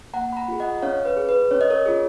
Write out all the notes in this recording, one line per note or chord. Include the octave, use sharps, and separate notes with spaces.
A#3 F#5 A#5
B5
F#5 A#5
F4 G#4
D#5 F#5
C#4 C#5 F5
B4
G#4
B4
C#4 C#5
D#5
A#4 C#5
F4 G#4